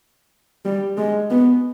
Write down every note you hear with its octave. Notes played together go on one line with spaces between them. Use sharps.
G3
G#3
B3